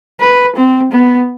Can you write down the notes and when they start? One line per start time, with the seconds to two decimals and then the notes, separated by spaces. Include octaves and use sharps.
0.21 B4
0.56 C4
0.92 B3